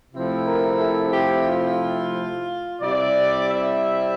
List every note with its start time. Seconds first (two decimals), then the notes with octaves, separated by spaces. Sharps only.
0.13 C3 F3 A3 C4 E4
0.46 A#4
0.80 A4
1.13 G4
1.47 F4
2.81 C3 G3 C4 E4 D5
3.47 E5